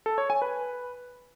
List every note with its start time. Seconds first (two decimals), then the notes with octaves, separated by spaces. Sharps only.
0.06 A4
0.18 C#5
0.30 G#5
0.42 B4